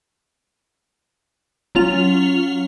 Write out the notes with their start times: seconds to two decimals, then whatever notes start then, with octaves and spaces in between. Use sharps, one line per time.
1.75 F#3 C#4 F4 F7